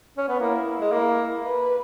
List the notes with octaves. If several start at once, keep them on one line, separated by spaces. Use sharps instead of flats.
C#4
B3
A#3 E4
G#3
A#3 E4
B4